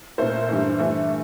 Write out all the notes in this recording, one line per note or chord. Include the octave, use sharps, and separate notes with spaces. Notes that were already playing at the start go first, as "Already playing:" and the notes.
A#2 A3 C5
G2 E3 A3
G2 E3 A3